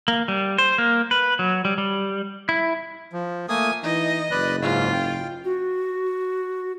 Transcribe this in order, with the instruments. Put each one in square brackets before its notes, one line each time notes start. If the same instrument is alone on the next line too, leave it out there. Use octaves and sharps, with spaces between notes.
[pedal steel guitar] A#3
G3
C5
A#3
B4
F#3
G3
G3
E4
[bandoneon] F3
[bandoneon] A3 A#3 D#6 [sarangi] G#5
[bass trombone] E3 [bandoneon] D#4 [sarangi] D#5
[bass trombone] F#1 [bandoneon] B4 D5 F#6
[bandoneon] G#2 C#3 [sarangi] F4
[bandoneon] G5
[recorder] F#4